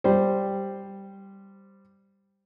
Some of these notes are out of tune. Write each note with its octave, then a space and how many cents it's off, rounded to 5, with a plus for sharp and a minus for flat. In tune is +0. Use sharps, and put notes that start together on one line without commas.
G3 +0 C5 +0